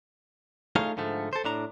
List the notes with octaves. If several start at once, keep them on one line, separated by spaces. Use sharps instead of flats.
A3 D#4 F4 G#4 C#5 F5
G#2 D3 F3 A3
A4 C5
A2 D4 A#5